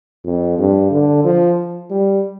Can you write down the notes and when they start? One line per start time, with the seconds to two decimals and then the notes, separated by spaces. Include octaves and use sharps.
0.25 F2
0.58 G2
0.91 D3
1.24 F3
1.90 G3